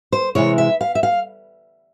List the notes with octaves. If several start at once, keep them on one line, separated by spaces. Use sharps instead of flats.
C5
C3 E3 G#3 E4 C#5
E5
F5
E5
F5